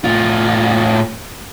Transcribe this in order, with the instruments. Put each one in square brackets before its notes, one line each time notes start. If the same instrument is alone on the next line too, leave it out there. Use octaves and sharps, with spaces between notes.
[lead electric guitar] A2 F4